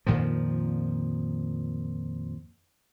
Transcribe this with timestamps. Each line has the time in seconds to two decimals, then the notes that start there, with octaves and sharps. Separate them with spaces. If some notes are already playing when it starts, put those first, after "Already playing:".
0.06 F2 A#2 D#3 F3